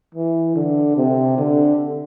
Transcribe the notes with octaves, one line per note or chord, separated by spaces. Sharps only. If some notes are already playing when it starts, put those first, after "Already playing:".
E3
D3
C3
D3